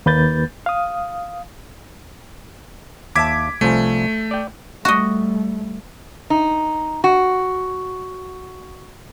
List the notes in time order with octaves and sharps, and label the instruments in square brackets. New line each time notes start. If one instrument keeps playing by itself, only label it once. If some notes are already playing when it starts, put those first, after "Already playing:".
[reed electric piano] D#2 A#3 B4 G6 A6
F5 D#6
[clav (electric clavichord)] D#2 E5 A5 [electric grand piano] D6 G#6 B6
[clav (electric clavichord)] C2 F3 G#5 [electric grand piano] A3
[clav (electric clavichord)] D5 G5
[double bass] G3 A3 [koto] F#4 D#5
[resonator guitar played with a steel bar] D#4
F#4